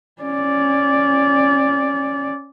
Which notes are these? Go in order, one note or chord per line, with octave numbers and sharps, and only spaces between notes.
C#4 D5